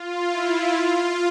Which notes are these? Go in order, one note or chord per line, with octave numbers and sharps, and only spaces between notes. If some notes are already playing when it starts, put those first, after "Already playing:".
Already playing: F4
E4
F4